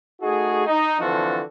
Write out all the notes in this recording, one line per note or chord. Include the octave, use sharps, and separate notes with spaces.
A3 D#4 F#4 G#4
D#4
D3 E3 F3 C4 F#4 A4